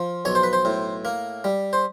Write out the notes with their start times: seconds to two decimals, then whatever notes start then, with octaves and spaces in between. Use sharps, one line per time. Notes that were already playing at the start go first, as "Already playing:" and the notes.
Already playing: F3
0.25 B1 C#5
0.35 C5
0.43 B4
0.53 C5
0.65 A2
1.05 A#3
1.44 G3
1.73 C5